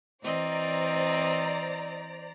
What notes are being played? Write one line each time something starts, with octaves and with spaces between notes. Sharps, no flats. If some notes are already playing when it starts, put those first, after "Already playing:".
E3 C4 C5 D5 D#5 A#5